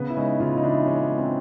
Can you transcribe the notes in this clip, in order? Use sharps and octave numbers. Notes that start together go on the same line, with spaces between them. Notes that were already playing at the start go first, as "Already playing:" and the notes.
Already playing: C#3 B3
E4
G#3 C#4 D#4
C#3 D#4 F4
D#4
E3 D4 E4
G#3 C#4 D#4
G#3
C4 D4